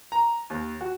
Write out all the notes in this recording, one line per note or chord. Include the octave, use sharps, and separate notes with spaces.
A#5
D#2
F#4